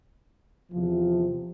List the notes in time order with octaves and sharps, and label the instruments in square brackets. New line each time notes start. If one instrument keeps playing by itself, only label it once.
[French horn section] E2 C3 F3